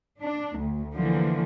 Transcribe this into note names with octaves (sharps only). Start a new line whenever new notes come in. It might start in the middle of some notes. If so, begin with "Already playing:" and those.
D4
D2
D3 E3 F3 A#3